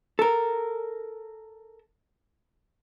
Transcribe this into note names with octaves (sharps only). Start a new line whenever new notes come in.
A4 A#4